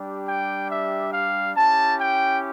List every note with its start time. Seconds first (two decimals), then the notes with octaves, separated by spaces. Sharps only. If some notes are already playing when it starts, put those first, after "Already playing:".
Already playing: G3 D4 G4
0.27 G5
0.70 E5
1.13 F5
1.56 C#4 E4 G4 A5
1.99 G5